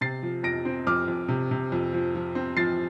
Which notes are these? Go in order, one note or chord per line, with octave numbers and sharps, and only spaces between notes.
C3 A6 C7
F3
F2 A#6 D7
C4
F2 D6 F6
F2
C3
C3
F2
F3
F3
C4
F3 A6 C7